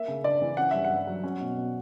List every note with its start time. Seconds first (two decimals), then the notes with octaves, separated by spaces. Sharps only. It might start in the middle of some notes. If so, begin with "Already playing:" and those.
Already playing: A#3 E5
0.08 C#3
0.24 D4 D5
0.42 E3
0.57 C#4 F#5
0.71 G2 E5
0.85 F#5
0.90 G2
1.07 F#3
1.24 C#4
1.41 B2
1.57 B2